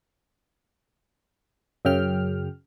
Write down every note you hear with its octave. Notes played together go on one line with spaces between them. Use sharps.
F#2 C#3 G5 F6